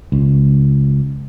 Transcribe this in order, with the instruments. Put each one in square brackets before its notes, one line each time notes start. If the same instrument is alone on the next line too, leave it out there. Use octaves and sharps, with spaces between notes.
[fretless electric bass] C#2